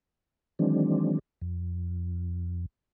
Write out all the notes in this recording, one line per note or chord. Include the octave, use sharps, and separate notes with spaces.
D#3 E3 F#3 G#3 C4 D4
F2